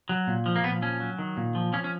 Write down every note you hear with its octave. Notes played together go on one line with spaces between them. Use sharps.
F#3
A#2
F3
A#3
A#2 B3
F3 C#4
F#3
D#3
A#2
F3
F3 C#4
C#4